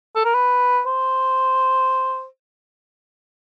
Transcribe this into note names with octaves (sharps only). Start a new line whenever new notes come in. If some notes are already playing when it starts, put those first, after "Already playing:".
A4
A#4
B4
C5